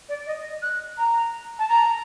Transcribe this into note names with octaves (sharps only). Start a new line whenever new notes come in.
D5
D#5
F#6
A#5
A5
A#5